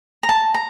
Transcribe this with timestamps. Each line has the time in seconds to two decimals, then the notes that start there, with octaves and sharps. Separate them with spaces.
0.23 A#5
0.29 A5
0.54 A#5